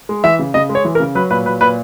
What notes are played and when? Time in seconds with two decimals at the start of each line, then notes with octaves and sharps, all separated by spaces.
0.09 G#3
0.24 E3 E5
0.39 C#3
0.54 C#3 D#5
0.69 G#3
0.75 C#5
0.85 E3
0.95 A#4
1.00 C#3
1.15 F#3 B4
1.31 A#2 B4
1.46 F#3 B4
1.61 A#2 B4